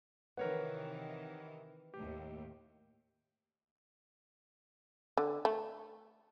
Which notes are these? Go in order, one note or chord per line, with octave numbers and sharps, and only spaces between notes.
C3 D#3 E3 A#4 B4 C#5 F#5
D#2 A2 G4
D3
A3